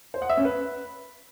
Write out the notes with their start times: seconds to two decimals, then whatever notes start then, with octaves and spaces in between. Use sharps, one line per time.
0.14 C5
0.22 F#5
0.29 E5
0.37 C#4
0.45 B4